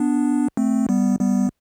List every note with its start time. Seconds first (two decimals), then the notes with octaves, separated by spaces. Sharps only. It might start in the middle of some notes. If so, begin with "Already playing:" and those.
Already playing: B3 D4
0.57 A3 C4
0.89 G3 B3
1.20 G3 B3